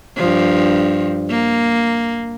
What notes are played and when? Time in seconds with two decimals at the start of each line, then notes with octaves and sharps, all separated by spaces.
0.16 G2 F3
1.30 A#3